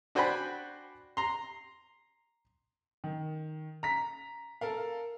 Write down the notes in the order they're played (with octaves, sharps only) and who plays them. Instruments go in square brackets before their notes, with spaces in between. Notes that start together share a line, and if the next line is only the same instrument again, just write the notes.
[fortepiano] D4 F#4 C5 G5 G#5 B5
A#5 C6
[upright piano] D#3
A#5 B6
A4 A#4 F5